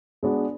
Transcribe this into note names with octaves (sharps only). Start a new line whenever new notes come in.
G#3 B3 D4 F#4